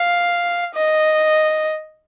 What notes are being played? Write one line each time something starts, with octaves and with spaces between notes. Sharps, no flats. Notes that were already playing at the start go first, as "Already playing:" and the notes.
Already playing: F5
D#5